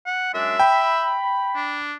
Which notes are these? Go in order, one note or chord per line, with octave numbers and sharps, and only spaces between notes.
F#5
F#2 G#3 D4 E5
G5 B5
D4